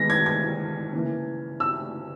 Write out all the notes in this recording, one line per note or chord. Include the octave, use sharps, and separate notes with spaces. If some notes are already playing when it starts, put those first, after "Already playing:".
Already playing: D#3 G#3 B3 A#6 B6
G#6
G#6
C#3 E3 A#3
E6